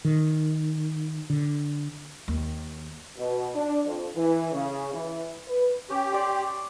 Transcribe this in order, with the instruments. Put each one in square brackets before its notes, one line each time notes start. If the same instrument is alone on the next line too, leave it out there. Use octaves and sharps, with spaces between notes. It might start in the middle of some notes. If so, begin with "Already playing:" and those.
[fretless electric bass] D#3
D3
[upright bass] D#2
[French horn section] B2
D4
F2
E3
C#3
E3
B4
[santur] C#4 [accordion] G4
[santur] D5 C6